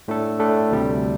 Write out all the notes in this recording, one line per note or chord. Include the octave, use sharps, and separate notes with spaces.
A2 A3 D4 A4
A2 A3 D4 A4
D2 C3 G3